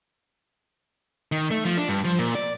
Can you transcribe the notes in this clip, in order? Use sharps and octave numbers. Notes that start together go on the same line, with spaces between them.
D#3
A3
F3
D4
G2
F3
A#2
D5